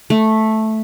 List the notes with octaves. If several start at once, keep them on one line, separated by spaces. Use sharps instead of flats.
A3